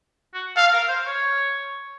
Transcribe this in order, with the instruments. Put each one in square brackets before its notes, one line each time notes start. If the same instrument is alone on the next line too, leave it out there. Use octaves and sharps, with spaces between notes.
[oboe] F#4
[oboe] A4 [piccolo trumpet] F5
[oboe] A#4
C5
C#5